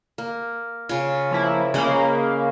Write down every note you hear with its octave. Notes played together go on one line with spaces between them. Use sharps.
A#3
C#3 F4
F3 A#3 E4
C#3 G#3 A#3 C5 B5